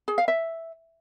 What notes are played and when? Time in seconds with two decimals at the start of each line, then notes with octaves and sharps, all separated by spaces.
0.08 G#4
0.18 F5
0.28 E5